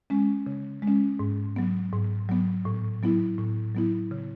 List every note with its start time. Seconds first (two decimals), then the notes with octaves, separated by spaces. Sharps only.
0.10 G#3 C#4
0.46 C#3
0.82 G#3
0.88 C#4
1.19 G#2
1.56 F#3 B3
1.93 G#2
2.29 F#3 B3
2.65 A2
3.03 F#3 B3 E4
3.38 A2
3.75 F#3 B3 E4
4.11 C#3